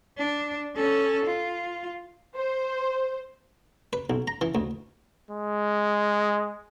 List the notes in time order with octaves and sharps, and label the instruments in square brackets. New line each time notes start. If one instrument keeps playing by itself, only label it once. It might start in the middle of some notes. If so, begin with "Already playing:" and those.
[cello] D4
C#4 A4
F4
[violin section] C5
[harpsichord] B4
B1
A#5
E3
D2
[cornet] G#3